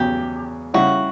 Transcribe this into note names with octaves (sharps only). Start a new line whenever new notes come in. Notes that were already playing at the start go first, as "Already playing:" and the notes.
Already playing: E2 C#3 F#3 G4
C#3 G3 C#4 E4 F#4